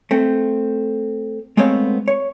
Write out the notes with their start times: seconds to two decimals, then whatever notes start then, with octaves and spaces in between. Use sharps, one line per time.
0.11 A3 C4
1.57 G#3 A3 B3 C4 C#5 F5
2.08 C#5